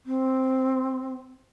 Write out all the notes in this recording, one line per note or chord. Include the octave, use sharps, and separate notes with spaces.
C4